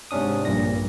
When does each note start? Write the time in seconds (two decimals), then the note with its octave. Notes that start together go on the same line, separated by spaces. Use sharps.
0.11 G#2 C3 C#4 D4 D#6
0.45 A#1 G2 A#2 A#6